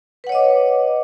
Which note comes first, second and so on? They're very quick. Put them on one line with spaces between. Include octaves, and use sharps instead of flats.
B4 F#5 C#5 D#5 D6